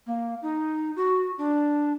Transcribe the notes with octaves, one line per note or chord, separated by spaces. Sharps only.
A#3
D#4
F#4
D4